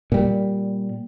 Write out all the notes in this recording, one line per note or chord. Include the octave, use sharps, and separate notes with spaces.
A#2 G3